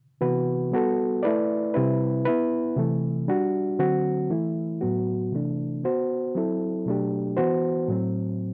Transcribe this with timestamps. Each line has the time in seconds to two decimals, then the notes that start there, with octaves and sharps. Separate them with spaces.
0.21 C3 E3 B3 F#4 B4
0.72 G3 B3 F#4 A4
1.23 A3 E4 B4 D5
1.74 C3 G3 C4 E4 B4
2.25 B3 E4 B4
2.76 C3 E3 A3
3.28 G3 D4 F#4
3.79 D3 F#3 C4 F#4
4.30 E3 A3 E4
4.81 A2 F#3 B3 F#4
5.32 C3 E3 A3 D4
5.84 B3 F#4 C5
6.35 F#3 C4 E4 A4
6.86 B2 F#3 A3 D4 G4
7.37 E3 B3 F#4 C5
7.88 A2 F#3 C4